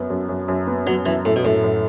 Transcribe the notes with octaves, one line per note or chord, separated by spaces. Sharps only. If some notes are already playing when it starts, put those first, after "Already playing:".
Already playing: F#2 B3
F#2
F#2
F#2
B3
F#3 B3
F#2 E3
F#2 A2
B2
F#2 A2
F#2